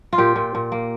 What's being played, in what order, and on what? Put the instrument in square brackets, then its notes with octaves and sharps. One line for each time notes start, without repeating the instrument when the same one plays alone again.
[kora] F4
A#2 G4
A#2
A#2
A#3